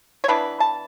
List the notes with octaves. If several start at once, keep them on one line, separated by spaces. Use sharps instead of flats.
C#5
E3 B3 D4 B4
A5